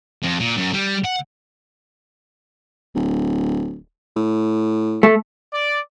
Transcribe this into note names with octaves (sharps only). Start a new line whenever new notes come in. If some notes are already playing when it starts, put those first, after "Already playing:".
F2
A#2
F#2
G3
F#5
D1
A2
A3
D5